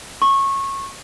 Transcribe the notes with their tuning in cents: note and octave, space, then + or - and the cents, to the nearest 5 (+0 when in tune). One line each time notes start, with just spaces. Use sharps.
C#6 -20